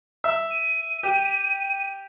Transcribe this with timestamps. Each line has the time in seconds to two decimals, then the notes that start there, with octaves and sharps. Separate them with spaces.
0.24 E5
0.51 D#7
1.03 G4